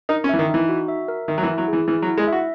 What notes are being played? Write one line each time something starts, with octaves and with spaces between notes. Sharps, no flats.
D#4 A#4
C#4
E3 E5
D#3
E3 D#4
F#4
E5
A#4
D#3 E5
F#3
E3
E4
F#3
E3 G#4
E3 E4
F#3
E4
G#3
F#4 E5